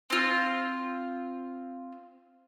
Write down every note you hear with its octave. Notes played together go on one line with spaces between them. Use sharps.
C4 F4